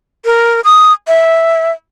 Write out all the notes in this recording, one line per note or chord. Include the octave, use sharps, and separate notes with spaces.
A#4
D#6
E5